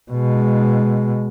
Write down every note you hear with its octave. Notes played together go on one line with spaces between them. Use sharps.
B2 G#3